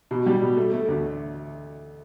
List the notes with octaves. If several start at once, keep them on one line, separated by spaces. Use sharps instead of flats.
B2
G3
B2
A3
A3
D2